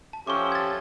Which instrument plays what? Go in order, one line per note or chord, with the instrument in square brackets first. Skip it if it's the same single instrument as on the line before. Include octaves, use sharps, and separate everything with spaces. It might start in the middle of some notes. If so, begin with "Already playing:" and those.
[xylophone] A5
[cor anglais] F3 [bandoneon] C#4 C#5 E5 [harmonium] G4 A4 [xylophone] C#6 D6
[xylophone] G#6 A6